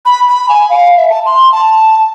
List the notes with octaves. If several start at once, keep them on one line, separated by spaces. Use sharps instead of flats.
B5
B5
G#5
F5
E5
A5
C6
A5